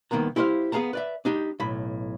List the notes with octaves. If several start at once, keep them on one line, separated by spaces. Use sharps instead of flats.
C2 D#3 A#3 B3 A#5
E4 G4 C5 D#5 F5
B3 G#4 F5 A5 A#5
B4 D5 E5
D4 D#4 G4
B1 A2 B5